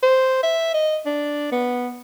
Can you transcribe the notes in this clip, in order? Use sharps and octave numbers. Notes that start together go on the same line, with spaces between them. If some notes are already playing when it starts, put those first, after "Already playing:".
C5
E5
D#5
D4
B3